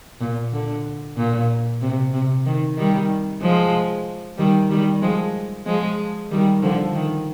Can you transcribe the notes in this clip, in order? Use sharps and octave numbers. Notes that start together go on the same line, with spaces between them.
A#2
D3
A#2
C3
C3
D#3
D#3 G3
F3 G#3
D#3 G3
D#3 G3
F3 G#3
F3 G#3
D#3 G3
D3 F3
D#3